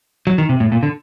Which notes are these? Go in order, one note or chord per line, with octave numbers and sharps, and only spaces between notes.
F#3
D#3
C3
A2
A#2
D3